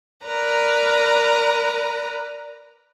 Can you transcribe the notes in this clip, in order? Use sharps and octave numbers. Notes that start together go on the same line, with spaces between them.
A#4 B4 D5 A#5